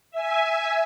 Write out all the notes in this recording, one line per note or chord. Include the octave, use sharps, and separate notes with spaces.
E5 G#5